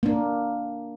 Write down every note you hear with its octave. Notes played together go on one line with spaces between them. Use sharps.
A#3 D4